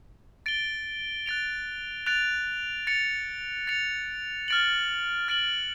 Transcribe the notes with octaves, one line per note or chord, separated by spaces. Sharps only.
A6 D7 G7
F#6 A6 D7 F7
F#6 A6 D7 F7
A6 C#7 F7
A6 C#7 F7
F6 A6 D7 F#7
F6 A6 D7 F#7